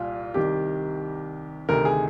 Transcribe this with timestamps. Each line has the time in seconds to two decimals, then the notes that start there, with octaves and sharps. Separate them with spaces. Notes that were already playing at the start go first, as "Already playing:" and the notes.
Already playing: C2 A#2 F4
0.34 C2 C3 D#3 G4
1.69 D2 C3 D#3 A#4
1.85 G#4